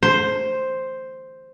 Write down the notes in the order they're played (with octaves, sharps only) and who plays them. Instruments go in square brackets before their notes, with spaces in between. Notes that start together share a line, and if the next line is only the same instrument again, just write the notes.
[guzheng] C5